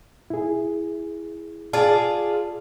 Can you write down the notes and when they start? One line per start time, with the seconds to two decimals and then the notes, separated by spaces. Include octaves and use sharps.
0.30 E4 G#4
1.73 F4 G#4 D5 A5